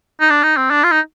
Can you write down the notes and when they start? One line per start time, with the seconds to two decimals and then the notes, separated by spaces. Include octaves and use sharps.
0.20 D#4
0.30 D4
0.43 D#4
0.57 C4
0.70 D4
0.84 F4
0.92 D#4